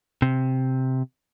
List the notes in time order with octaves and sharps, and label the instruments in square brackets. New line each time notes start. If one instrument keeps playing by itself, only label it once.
[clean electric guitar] C3